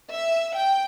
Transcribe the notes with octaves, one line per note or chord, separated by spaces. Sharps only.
E5
G5